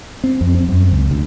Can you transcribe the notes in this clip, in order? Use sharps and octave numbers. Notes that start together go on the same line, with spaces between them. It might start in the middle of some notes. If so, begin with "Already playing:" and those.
C4
F2
C4
F#2
C#2
D2